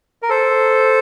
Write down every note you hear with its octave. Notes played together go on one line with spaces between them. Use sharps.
A#4
A4 C5